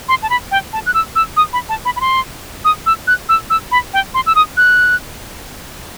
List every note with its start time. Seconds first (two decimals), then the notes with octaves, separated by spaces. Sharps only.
0.08 C6
0.23 A5
0.30 B5
0.51 G5
0.73 A5
0.86 F#6
0.94 E6
1.16 E6
1.37 D#6
1.53 B5
1.69 A5
1.85 B5
1.96 B5
2.01 C6
2.65 D#6
2.86 E6
3.07 F#6
3.29 E6
3.50 E6
3.71 B5
3.93 G5
4.14 C6
4.26 E6
4.35 D#6
4.57 F#6